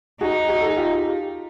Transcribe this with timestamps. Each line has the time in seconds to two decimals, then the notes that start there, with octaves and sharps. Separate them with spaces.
0.21 D#4 F#4 G#4
0.48 F#4 G#4
0.61 A4
0.69 G#4
0.77 F4 G4